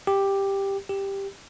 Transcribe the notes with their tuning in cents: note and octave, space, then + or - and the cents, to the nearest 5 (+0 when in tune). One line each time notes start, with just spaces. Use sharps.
G4 +5
G4 +5